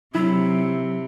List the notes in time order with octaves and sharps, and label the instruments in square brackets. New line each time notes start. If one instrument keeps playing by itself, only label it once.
[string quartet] C3 [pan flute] F#3 [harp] E4